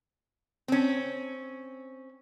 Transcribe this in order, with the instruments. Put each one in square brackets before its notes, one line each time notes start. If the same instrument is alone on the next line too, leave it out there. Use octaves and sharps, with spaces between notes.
[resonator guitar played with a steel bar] C4 C#4